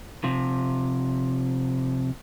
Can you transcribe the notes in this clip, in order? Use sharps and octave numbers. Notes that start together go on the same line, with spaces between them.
C3 F3